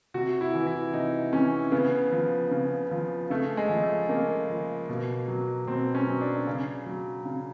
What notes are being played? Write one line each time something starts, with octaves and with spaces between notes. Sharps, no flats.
C3 F#4
E4
E3
E4
C3 D#4
E3 C#4
C#3 B3
F3
C#3
F3
C#3 A3
G#3
F3
A3
C#3 A#3
F3
B2
F#3
B2 C4
C#4
F#3
D4
C#3
F#3
C#3